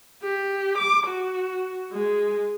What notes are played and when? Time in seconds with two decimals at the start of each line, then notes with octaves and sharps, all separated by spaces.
0.23 G4
0.78 D6
1.07 F#4
1.92 G#3